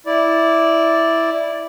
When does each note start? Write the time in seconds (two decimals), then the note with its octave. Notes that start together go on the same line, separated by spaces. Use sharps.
0.06 E4 D5